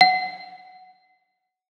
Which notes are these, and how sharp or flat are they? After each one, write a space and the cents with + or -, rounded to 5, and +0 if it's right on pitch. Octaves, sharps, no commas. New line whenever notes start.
F#5 +5